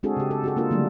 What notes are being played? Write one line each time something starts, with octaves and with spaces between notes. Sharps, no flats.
G#3 C4 D4 F#4 G#4 A4
C#3 G4
A4
F#4 G#4 A4
A#3 D4 F4 A4 A#4
D3 F#3 G3 A3 A#3 D4